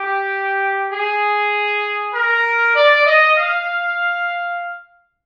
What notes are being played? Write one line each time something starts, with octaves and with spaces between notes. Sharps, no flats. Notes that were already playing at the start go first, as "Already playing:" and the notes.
Already playing: G4
G#4
A#4
D5
D#5
F5